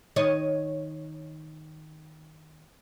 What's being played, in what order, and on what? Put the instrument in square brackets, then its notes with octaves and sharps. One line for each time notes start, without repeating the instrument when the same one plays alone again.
[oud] D#3 C#5 D#5